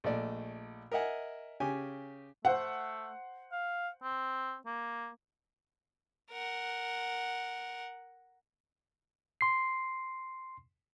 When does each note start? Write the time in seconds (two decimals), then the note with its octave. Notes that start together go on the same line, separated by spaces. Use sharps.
0.04 A#1 A3 D5 D#5
0.92 A#4 D#5 E5 F#5 G#5
1.60 C#3 G4 G#5
2.45 A3 C5 F#5
3.52 F5
4.03 C4
4.66 A#3
6.31 A#4 F#5
9.41 C6 C7